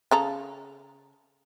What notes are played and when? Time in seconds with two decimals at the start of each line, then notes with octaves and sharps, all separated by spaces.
0.11 C#3 A4 A#5